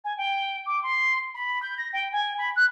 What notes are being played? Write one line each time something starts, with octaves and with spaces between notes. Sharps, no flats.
G#5
G5
D6
C6
B5
G6
A#6
G5
G#5
B5
F#6